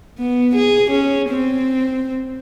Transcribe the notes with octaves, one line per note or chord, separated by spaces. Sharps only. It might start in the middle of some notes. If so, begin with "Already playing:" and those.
B3
G#4
C#4
C4